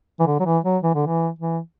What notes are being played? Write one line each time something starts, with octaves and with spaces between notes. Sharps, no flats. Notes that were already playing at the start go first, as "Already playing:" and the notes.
E3
D3
F#3
E3
F#3
E3
D3
E3
E3